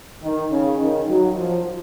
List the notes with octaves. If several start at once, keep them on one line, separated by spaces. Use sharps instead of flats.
D#3
C#3
D#3
F#3
F3